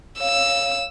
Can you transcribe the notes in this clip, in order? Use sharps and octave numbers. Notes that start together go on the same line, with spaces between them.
C#5 F5 E6